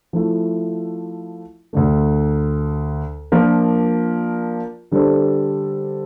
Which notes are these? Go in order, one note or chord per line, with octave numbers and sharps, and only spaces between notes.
F3 A3 E4
D2 D3 A3
F3 A#3 D4 F4 A#4
D3 G3 D4 A4 C5